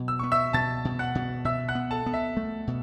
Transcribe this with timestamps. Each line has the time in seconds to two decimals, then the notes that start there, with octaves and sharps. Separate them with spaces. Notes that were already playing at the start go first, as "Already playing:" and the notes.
Already playing: B2 F#3
0.08 E6
0.19 B3 C#6
0.32 E5 E6
0.53 B2 A5 A6
0.85 B2
0.99 F#5 F#6
1.15 B2
1.45 B2 E5 E6
1.68 F#5 F#6
1.75 B3
1.91 A4 A5
2.06 B3
2.14 E5
2.37 A3
2.67 B2